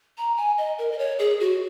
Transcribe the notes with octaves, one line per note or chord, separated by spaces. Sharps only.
A#5
G#5
D#5
A#4
D#5
C#5
G#4
F#4